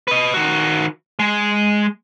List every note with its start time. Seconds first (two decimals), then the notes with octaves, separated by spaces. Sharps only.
0.08 B4 D#5
0.34 D#3 F#4
1.19 G#3